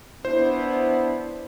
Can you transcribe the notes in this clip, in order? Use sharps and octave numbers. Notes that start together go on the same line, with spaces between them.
B3 D4 E4 C5